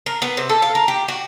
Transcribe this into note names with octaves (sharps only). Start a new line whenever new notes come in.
A#4
B3
C3
A4
F5
A#4
G4
F#4